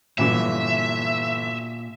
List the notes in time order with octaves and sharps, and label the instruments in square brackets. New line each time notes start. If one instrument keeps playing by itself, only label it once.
[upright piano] G1 E3 F#3 [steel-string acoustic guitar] A#2 [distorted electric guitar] E5